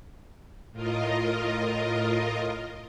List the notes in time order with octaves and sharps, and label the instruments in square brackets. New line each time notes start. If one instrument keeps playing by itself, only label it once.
[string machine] A2 F4 A#4 D#5